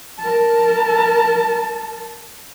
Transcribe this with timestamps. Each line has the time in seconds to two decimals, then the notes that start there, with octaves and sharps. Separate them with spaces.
0.19 A#4 A5